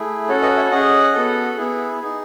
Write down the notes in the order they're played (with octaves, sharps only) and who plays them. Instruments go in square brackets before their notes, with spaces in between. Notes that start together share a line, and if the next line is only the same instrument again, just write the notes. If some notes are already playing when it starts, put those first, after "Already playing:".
Already playing: [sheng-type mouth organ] A3 E4 G#4
C#4 F#4 A4 C#5
B4 D#5
C#5 E5
C#4 G#4 D#5 F#5
B3 F#4 A4
B3 E4 G#4
D#4 G#4